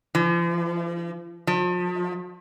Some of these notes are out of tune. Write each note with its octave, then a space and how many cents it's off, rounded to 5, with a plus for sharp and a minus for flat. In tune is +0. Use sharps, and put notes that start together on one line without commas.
F3 -40
F3 +40